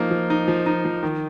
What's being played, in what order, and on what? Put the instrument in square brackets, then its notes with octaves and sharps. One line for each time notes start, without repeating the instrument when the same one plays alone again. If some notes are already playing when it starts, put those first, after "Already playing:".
Already playing: [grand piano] F3 A#3 D#4
F3
D#4
F3
D#4
F3
D#3